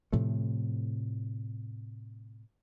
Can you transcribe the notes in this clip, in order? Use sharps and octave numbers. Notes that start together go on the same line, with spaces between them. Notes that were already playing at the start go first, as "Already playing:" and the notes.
A2 C3 F3 A3